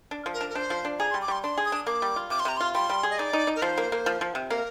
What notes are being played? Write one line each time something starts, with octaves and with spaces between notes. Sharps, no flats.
D4
F3
A#4
D4
A#4
D4 C5
F3
D4
G#4 A#5
C6
G3
D6
G3 C6
D4 C6
G#4
D#6
D4
A#3 D6
G3
F4
C3 D6
C6
C3 A#5
F4 C6
G3 C6
G3
G#4
D#5
D#4 D5
D#4
D#4
A#4
F3 C5
A#3
A#3
F3
F3
C3
A#3 A#4